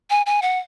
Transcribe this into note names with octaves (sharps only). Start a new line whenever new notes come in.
G#5
G#5
F#5